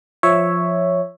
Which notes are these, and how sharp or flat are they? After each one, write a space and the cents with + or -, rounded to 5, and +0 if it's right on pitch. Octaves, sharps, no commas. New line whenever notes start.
F3 +0 C#5 +0 E5 +0